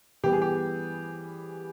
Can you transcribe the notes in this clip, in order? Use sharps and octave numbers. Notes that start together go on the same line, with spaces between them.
E3 G3 B3 G4
G#4
G4